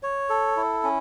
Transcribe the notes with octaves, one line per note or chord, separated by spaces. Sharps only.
C#5
A4
E4
C#4